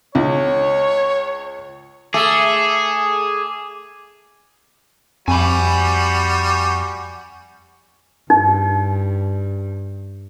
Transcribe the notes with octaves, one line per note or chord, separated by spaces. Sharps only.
C#2 C#5
A3 G#4 D6
F2 G3 F#4 G#5 B5
G2 D#4